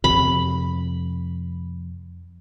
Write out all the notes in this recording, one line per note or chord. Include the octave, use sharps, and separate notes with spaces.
F2 C3 B5